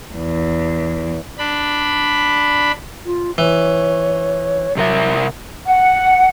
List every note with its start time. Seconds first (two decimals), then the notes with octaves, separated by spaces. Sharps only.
0.14 E2
1.38 D4 B5
3.05 F4
3.38 E3 C#5
4.77 C3 F#3 A#4 E5
5.66 F#5